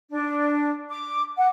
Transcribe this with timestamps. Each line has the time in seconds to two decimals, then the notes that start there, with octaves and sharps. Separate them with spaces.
0.12 D4
0.89 D6
1.36 F#5